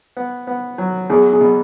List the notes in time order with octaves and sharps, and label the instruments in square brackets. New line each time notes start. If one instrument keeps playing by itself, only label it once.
[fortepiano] B3
B3
F#3
[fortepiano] E2 [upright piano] G#4
[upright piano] G#4
[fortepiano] B2